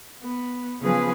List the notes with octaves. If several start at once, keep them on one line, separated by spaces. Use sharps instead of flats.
B3
C#3 F3 B3 G#4 B4